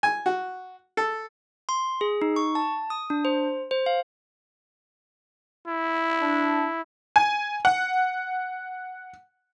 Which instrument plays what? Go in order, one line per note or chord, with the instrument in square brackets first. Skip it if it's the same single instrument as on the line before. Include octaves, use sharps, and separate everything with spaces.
[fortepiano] G#5
F#4
A4
[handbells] C6
G#4
D#4
C#6
A5
D#6
D4
C5
C5
F5
[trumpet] E4
[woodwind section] D4
[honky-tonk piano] G#5
F#5